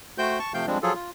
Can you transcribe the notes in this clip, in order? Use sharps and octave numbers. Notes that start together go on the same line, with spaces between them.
A3 F#4 C5 G5 G6
A5 C#6
C3 F3 A3 F5 G5 G6
F3 G3 G#3 C4 D4
F3 F#3 F4 G#4 A4
F4